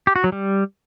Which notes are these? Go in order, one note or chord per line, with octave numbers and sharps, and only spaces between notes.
G4
F#4
F#3
G3